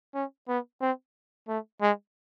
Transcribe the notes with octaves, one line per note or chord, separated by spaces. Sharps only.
C#4
B3
C4
A3
G#3